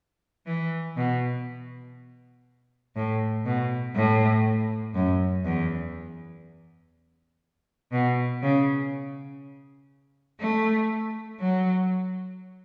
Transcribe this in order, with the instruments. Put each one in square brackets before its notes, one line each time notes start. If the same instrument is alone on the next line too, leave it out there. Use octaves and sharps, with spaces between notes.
[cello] E3
B2
A2
B2
A2
F#2
E2
B2
C#3
A3
F#3